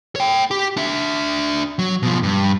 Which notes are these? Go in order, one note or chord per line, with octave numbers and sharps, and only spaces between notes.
C#5 G5
G4
D4 E5
F#3
B2 F3
G2